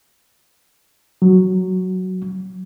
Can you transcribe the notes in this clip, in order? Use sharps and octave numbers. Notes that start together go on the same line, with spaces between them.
F#3